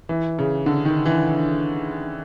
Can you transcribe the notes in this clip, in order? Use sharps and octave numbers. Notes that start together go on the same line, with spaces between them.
E3
C#3
D3
D#3
E3